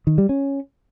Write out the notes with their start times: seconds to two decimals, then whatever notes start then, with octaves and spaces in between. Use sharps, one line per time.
0.07 D#3
0.18 G3
0.29 C#4